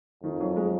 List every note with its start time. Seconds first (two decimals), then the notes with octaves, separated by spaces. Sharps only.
0.23 F2 D#3
0.40 F#3
0.56 G#3